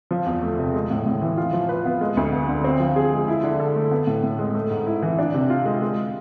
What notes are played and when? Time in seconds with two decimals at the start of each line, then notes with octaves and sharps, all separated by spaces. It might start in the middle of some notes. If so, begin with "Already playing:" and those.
0.11 F3
0.26 E2
0.43 A3
0.58 C3
0.74 G#3
0.90 A2
1.06 A2
1.22 E3
1.37 F4
1.53 F3
1.69 B4
1.85 B3
2.01 G#3
2.17 D2
2.33 B3
2.48 D3
2.64 C4
2.80 F3
2.96 G#4
3.12 G#3
3.28 E4
3.43 D3
3.60 A4
3.76 A3
3.91 B3
4.07 A2
4.24 A2
4.39 G#3
4.55 A3
4.70 G#2
4.86 E4
5.02 E3
5.19 D4
5.34 C3
5.50 F4
5.65 G#3
5.82 G#3